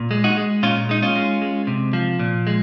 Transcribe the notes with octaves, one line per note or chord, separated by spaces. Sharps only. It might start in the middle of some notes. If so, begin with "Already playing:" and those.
Already playing: A#2
G#3
D#4 F#4
G#3
A#2 C#4 F4
G#3 D#4
C#4 F4
G#3
G#3
C3
F3
A#2
G#3